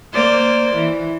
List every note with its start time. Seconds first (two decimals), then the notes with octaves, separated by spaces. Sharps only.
0.13 A#3 C5 D5
0.75 E3